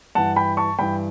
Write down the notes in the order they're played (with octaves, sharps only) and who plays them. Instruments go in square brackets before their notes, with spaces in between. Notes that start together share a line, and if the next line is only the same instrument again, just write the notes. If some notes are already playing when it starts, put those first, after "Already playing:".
[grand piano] G2 E3 F#5 A5
G5 B5
A5 C#6
G2 E3 G5 B5